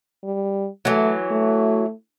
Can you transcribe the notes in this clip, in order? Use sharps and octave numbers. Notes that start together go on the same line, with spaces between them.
G3
E3 F#3 A3
A3